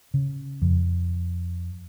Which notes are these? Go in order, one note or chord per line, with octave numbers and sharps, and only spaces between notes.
C#3
F2